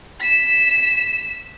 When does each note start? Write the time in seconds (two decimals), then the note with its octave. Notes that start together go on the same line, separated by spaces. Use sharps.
0.20 B6 E7